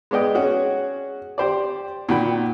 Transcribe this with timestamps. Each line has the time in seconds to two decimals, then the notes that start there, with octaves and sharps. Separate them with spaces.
0.11 G#3 B3 D5 D#5 G5
0.35 C#4 F#4 G#4
1.38 G4 C5 D5
2.09 A#2 D#3 F#4 G5 B5